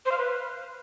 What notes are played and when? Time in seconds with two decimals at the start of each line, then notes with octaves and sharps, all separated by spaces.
0.05 C5
0.12 F5
0.18 B4